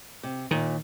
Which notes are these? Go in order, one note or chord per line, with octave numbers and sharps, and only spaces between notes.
C3
D#2 A#2 D#3